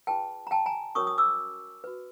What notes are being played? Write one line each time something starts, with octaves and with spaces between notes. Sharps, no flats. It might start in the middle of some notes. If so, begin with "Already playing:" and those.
F4 G#4 B4 G5 A5
A#5
G5 A5
G#5 A#5
C#4 F#4 A#4 C#5 C#6 D#6
D#6
D6 E6
F#4 B4